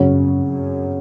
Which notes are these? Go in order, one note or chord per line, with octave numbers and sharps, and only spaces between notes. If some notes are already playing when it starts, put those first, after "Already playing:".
Already playing: F#2 C#3 F#3 C#4
F#2